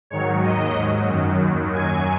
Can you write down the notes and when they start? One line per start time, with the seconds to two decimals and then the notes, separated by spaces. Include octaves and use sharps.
0.10 G#2 D#3 F#3 C#5
0.43 D#2 D#3 F#3 D#5
0.76 G#2 F#3
1.08 F#2 D#3 F#3
1.41 D#2 D#3 F#3
1.74 F#2 F#3 G#5